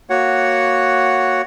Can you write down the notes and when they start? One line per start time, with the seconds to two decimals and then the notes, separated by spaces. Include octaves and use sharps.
0.10 A#3 F#4 C#5 F#5